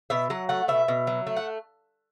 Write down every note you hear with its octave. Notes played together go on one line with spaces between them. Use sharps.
B2 E5
F#3 F#5
A3 F#5
B2 E5
B2
F#3
A3
F#5